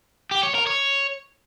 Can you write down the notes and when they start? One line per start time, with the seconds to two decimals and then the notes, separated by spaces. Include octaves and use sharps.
0.31 G4
0.43 C#5
0.55 A#4
0.67 C#5